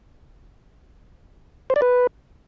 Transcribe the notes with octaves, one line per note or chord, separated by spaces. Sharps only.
C5
D5
B4